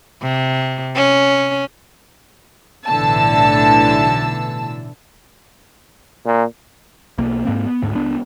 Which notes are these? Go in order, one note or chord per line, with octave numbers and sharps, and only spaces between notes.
C3
C#4
B1 A2 D3 E3 A5 E6
A#2
B1 A#3
G#2 A#3 C4
B3
D2 G#2
C#2 B3 D4